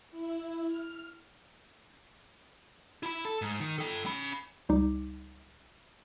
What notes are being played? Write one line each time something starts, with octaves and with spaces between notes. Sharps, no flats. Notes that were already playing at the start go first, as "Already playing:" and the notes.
E4
F6
E4 B5
A4
G#2
D#3
A4 G5
C#4 B5
C#2 G3 D#4 D6